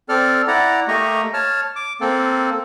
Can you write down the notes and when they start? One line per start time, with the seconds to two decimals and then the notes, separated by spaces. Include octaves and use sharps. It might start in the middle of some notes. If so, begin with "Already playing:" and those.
0.09 C4 A4 D5 F6
0.48 E4 D5 F#5 A#5
0.88 A3 A#3 G4 D#5 A#5 C#6
1.34 C#5 A5 F6
1.76 D6
2.01 A#3 C4 A4